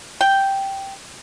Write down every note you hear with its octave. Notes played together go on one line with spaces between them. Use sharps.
G5